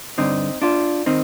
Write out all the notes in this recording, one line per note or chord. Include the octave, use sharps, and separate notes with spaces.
G2 D3 C4 D#4
D4 F4
D#3 C4 D#4